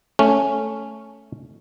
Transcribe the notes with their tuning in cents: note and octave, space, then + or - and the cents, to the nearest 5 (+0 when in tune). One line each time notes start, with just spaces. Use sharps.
A3 +0 C#4 +0